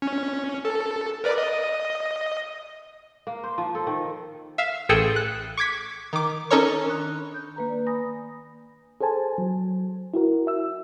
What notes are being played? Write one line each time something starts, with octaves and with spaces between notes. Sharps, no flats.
C#4
A4
A#4 B4 D5
D#5
A#3
C5
F3
A4
D#3
E5 F5
A1 G#4 A4 G5 E6 C#7
F#6
C#6 D6 G#6 B6
D#3 D6
C#4 D#4 A4 A#4 C#5 C#6
D#3 D4 C6 C#6 D#6 F#6
B5
G6
A#3 B4 A#5
D5
G#5 B5 D#6 A#6
G#4 A4 C5 G#5 A5
F#3
E4 F#4 A#4
E5 E6